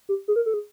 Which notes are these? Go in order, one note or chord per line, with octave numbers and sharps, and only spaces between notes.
G4
G#4
A#4
A4
G#4